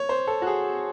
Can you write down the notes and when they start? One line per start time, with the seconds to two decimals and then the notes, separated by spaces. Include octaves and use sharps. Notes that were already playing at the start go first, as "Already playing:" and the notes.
Already playing: C#5
0.09 C5
0.27 A4
0.42 F#4
0.47 G#4